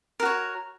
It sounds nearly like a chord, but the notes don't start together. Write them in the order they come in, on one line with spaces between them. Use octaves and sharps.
A#4 F#4 C#5